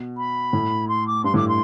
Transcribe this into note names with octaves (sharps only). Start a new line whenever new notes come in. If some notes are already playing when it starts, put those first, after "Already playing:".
Already playing: B2
B5
A2
C6
D6
G2 C6
A2 D6
C6